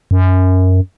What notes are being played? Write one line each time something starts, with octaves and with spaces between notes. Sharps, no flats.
F#2